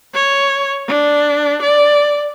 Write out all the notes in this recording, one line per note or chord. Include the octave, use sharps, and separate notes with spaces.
C#5
D4
D5